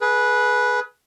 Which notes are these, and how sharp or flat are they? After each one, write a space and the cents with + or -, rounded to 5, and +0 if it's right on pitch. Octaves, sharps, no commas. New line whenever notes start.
G#4 +25 B4 -10